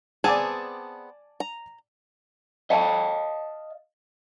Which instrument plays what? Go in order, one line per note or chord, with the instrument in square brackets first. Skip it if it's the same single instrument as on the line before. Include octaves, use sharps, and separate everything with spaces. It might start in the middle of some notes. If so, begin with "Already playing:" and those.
[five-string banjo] B3 C4 G#4 [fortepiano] D5 G#5 A5
[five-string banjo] A#5
[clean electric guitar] D#5 F5 A5